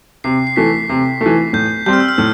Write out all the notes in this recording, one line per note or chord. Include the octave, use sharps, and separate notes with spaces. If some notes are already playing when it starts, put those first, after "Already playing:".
C3 C7
C7
E3 A3 B6
C3
A3
E3
A2 G6
G3 C4 G6
F6
E6
F6
A2